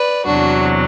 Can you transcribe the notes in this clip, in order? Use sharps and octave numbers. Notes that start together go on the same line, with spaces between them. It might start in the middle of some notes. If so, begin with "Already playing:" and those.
Already playing: B4 D5
E2 C3 F#3 D4 F#4